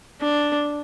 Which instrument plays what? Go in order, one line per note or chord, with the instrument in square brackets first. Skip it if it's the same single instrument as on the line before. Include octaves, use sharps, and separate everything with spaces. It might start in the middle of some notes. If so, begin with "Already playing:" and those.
[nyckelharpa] D4